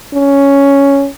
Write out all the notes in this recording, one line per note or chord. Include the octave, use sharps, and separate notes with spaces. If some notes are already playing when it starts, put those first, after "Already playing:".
C#4